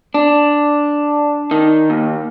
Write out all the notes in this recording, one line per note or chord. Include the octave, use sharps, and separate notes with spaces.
D4
D#3
D#2